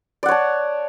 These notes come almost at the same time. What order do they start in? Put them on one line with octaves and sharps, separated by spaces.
D5 F#5 C#5 A5